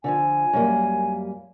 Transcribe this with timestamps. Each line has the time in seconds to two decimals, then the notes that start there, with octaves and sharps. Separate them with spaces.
0.04 D3 E3 F3 G#5
0.53 F#2 G3 A#3